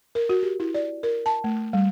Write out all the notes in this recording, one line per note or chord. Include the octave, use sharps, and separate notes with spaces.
A#4
F#4
G4
E4
D5
A#4
A5
A3
G3